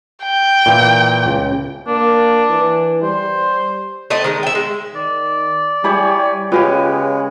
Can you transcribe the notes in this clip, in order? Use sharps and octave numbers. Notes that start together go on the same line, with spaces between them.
G5
A#2 E3 A#3
C#2
A#3 D4
E3
G3 C5
A3 C4 D#5
D#3 G#3
E5 G5
G#3
D#3 D5
G3 E4 G4 G#4 C#5 B5
C#3 G#3 B3 F4 G4 C#5